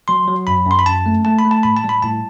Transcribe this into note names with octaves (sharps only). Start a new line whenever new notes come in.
F#3 C6
F#3
F#2 B5
F#2 C6
B5
F#2 A5
A3
A3 A5
B5
A3
A5
A2 B5
A5
G3
B5
A2 A5